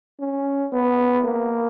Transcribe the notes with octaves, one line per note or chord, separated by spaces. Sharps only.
C#4
B3
A#3